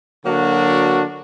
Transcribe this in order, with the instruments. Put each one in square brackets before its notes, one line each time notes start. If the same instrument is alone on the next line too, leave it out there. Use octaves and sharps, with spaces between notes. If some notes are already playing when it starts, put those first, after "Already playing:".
[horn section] D3 F#3 A#3 D4 F#4